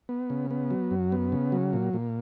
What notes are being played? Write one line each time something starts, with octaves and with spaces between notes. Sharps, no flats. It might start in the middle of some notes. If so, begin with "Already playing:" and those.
B3
C#3
B3
F#3
F#2
B3
C#3
F#3
A#2
A#2